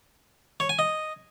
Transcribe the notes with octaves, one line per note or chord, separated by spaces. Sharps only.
C#5
G#5
D#5